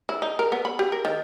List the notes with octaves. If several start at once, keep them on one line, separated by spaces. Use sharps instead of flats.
E4
D#4
A#4
B3
B5
G4
A#4
D#3